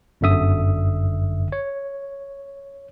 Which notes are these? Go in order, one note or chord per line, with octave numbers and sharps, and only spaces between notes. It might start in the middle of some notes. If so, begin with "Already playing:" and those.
G1 F#2 D3 E5 D#6
C#5